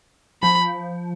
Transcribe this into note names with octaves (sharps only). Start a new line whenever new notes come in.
F3 B5